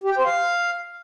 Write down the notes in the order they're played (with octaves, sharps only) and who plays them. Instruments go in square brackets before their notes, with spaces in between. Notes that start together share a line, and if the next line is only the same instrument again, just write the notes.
[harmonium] G4
G5
C5
F5